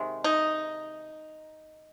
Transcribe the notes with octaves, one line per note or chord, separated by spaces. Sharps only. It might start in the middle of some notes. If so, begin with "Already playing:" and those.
Already playing: C3 D#3 G#3
D#4